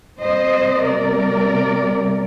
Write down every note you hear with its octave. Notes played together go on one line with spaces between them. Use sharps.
C3 G3 C5 D#5
A#4 D5